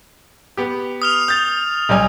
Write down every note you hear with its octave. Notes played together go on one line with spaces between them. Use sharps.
B3 G4
D#6 F6 F7
D#6 G6 A6
B1 G3 G#5